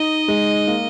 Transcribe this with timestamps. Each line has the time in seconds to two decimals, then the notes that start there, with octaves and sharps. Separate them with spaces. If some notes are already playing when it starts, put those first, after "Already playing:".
Already playing: D#4 D#5
0.28 G#3
0.67 A#3